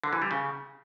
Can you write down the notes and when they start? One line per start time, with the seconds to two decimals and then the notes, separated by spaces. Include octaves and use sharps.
0.04 D3
0.13 E3
0.22 G3
0.31 C#3